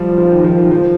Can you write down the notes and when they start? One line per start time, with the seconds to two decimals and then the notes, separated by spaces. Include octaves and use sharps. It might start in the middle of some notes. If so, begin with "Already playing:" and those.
Already playing: F3 G3
0.18 F3
0.31 D#3
0.44 F3
0.58 D#3
0.71 F3